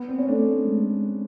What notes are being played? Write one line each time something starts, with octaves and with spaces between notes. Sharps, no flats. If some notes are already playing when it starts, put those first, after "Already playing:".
Already playing: B3
C4
C#4
A3 D4
G#3